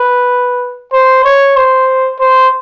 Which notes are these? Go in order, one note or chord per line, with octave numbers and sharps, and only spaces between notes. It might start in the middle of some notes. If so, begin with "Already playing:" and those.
Already playing: B4
C5
C#5
C5
C5